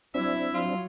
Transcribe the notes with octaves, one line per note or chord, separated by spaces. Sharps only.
F#3 C4 D4 E4 E5
F#3 F4